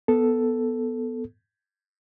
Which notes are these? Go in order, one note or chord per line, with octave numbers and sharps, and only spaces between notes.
B3 A4